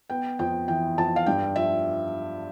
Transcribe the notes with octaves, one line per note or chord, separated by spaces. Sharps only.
B3 G5
F2 G5
E3 G5
F2 A5
F5
G2 G5
F3 E5